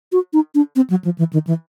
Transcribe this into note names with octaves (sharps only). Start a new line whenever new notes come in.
F#4
D#4
D4
C4
F#3
F3
E3
D#3
E3